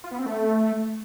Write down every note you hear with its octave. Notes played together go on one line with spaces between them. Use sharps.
F4
B3
C4
A3